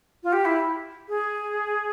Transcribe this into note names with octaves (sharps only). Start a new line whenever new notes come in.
F4
G4
E4
G#4